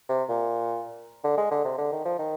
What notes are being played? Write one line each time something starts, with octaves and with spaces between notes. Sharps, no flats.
C3
A#2
D3
G#3
D3
C3
D3
D#3
F3
D#3